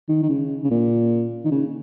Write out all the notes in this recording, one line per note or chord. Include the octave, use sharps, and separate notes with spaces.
D#3
D#3
C#3
C#3
A#2
D#3
C#3